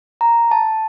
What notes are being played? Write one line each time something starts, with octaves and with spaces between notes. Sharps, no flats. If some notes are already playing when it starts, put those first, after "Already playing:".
A#5
A5